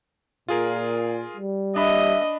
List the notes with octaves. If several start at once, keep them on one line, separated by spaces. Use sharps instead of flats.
A#2 F4 G#4 A#4
G3
D4 D#5 E5 B5